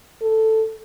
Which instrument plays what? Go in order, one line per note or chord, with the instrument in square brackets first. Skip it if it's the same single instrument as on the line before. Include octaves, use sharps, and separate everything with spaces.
[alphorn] A4